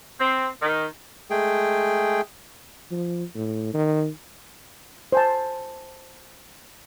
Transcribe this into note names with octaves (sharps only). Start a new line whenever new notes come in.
C4
D#3
G#3 A3 G#4 G5
F3
A2
D#3
C5 G#5 A5